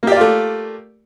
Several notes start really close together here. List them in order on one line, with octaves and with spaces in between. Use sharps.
A#3 G4 D5 F4 A3